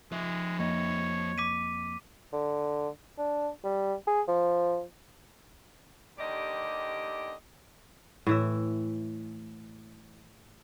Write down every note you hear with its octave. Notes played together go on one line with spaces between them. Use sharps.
F3 G#3 E5
F2 A#3 C#5 D#5
D6 B6 D#7
D3
D4
G3
G#4
F3
D#2 D3 G4 D5 D#5
A2 E3 E5